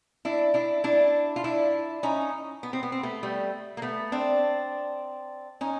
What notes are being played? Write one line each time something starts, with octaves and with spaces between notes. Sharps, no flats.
D4 E4
D4 E4
D4 E4
F4
D4 E4
C#4 D#4
B3
C4
B3
C4
A3 B3
G3 A3
A#3
A3 B3
C4 D4
C#4 D#4